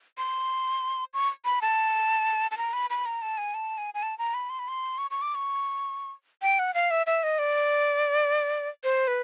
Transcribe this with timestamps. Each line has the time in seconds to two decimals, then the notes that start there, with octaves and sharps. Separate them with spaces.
0.18 C6
1.14 C#6
1.45 B5
1.62 A5
2.51 A5
2.58 A#5
2.73 B5
2.90 B5
3.06 A#5
3.22 A5
3.38 G#5
3.54 A5
3.78 G#5
3.94 G#5
4.03 A5
4.18 A#5
4.34 B5
4.50 C6
4.59 B5
4.68 C6
4.98 C#6
5.11 C#6
5.22 D6
5.35 C#6
6.42 G5
6.59 F#5
6.74 F5
6.91 E5
7.07 E5
7.23 D#5
7.39 D5
8.84 C5
9.08 B4